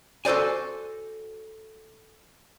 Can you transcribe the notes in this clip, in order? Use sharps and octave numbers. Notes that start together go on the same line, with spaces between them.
F#4 A4 C5 D5 G#5